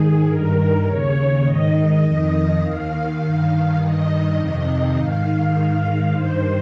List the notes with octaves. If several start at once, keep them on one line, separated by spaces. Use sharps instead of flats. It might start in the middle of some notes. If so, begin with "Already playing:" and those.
Already playing: G#2 D#3 G#4
G2 D#3 A#4
D#2 C#3 C#5
G#2 D#3 D#5
F2 D#3
D#2 D#3 F5
G2 D#3
G2 D#3 D#5
F2 C3 D#3 D#5
D#5
G#2 D#3 F5
G#2 D#3
G2 D#3 C5